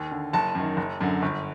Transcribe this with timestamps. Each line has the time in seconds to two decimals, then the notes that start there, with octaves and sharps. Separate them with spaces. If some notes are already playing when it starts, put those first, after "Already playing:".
Already playing: D#2
0.11 D3
0.33 F#1 A5
0.55 F#2 D#3
0.77 F#1
1.01 F#2 D3
1.22 G1